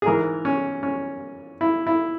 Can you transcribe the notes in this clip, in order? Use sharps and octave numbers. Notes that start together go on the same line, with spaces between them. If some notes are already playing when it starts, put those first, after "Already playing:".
G#4
G#2 E3 A#4
C#4
C#4
E4
E4